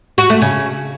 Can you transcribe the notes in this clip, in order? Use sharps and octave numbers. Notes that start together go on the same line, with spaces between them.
F#4
A3
C#3